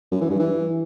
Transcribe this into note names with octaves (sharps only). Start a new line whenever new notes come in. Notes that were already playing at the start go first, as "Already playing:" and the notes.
F#2
E3
G2
E3